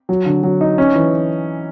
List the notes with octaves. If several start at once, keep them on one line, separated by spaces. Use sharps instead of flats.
F#3
D3
F#3
D#4
C#4
E3